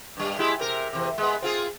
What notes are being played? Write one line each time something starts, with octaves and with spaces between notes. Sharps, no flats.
G2 G3
G#3 E4 G4
C3 A#4
E2 C3
G#3 B3
C4 F4 G#4